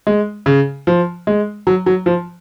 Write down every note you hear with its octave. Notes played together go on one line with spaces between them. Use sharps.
G#3
C#3
F3
G#3
F#3
F#3
F3